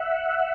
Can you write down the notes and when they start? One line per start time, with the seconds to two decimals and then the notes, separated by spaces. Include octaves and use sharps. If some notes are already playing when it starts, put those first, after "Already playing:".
Already playing: E5 F#5